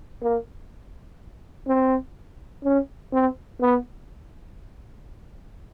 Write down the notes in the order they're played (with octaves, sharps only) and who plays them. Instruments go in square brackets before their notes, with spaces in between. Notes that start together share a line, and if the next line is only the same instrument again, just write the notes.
[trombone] A#3
C4
C#4
C4
B3